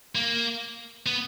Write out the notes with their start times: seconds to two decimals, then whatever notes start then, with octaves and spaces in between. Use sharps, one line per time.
0.15 A#3
1.06 B3